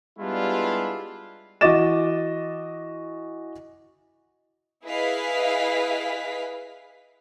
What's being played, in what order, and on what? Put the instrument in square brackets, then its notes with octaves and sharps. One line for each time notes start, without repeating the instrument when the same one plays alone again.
[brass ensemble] G3 G#3 B3 D4 E4 F4
[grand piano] E3 F#4 D#5 D6 A6 E7
[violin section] E4 G#4 B4 D#5 F5 B6